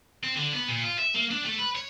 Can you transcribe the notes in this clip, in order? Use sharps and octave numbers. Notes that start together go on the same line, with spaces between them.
C4
D3
B3
A#2
F4
E5
A#3
D4
A3
B4
C#5